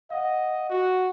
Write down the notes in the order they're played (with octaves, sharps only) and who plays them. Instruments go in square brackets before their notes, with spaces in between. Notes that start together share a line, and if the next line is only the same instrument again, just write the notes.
[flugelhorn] D#5 [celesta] F5 F#5
[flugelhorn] F#4